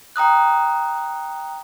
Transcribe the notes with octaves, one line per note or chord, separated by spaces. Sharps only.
G5 A#5 D#6 F#6